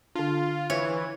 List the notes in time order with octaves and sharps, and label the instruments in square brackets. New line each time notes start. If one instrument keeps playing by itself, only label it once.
[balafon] D3 D4 [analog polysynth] F4
[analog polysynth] E3 [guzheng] C#5 [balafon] E5